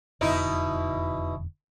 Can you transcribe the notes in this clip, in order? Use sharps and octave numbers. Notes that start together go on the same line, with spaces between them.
E1 F2 B2 D3 D#4 E4